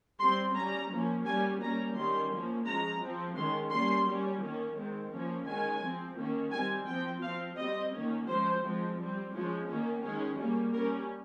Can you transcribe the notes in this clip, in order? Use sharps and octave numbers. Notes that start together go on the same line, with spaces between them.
G3 C4 C6
G3 C#4 A#5
F3 A#3 C#4
G3 A#3 C#4 G#5
G3 A#3 C#4 A#5
D#3 G3 C#4 C6
F3 A#3 C#4
F3 G#3 C#4 A#5
F3 C4
D#3 G#3 C#4 C6
G3 A#3 C#4 C6
G3 C#4
D#3 A#3 C#4
D#3 G#3 C4
F3 A#3 C#4
D#3 G#3 C#4 G#5
F3 C4
D#3 A#3 C#4
G3 C4 G#5
F3 C4 G5
F3 C4 F5
G3 C4 D#5
D#3 A#3 C#4
F3 G#3 C#4 C5
F3 G#3 C4
G3 C4
F3 G#3 C#4
D#3 A#3 C#4
D#3 G#3 C#4 G#4
G3 A#3 C#4
G3 C#4 A#4